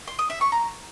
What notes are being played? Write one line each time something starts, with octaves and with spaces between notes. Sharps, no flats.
C6
D#6
E5
C#6
A#5